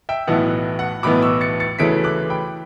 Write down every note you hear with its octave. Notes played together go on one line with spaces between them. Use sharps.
E5 G5
B1 A2 E3 B3 F#5
F#5
B1 A2 E3 B3 B5 D6
C#6 E6
A6 C#7
A6 C#7
D2 C#3 E3 A3 C#4 B6 D7
D6 F#6
G5 B5